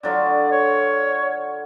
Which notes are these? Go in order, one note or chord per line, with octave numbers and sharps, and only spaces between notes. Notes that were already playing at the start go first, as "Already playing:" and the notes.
D3 F#3 F4 D5
C#5